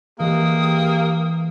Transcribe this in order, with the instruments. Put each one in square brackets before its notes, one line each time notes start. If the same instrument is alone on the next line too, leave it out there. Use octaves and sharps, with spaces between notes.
[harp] E3 G#3 C4 [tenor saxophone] A#3 [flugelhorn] G4 [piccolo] D#6